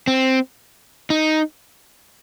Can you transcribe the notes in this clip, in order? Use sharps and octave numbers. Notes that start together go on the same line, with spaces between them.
C4
D#4